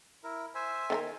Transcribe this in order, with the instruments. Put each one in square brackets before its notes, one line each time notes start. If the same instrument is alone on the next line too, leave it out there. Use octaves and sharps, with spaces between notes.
[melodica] E4 A#4
C5 E5 G#5
[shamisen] D#3 F4 A#4